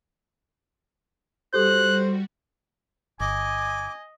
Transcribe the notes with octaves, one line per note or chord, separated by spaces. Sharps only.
G3 F#4 G4 A4 C5 F#6
G1 D#5 G#5 D6